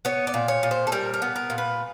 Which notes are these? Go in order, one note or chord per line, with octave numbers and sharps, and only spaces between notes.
B3 C#5
D5
A#2
C#5
A#2
C5
A4
G3 A#4
A#4
B3
A#4
A#2
B4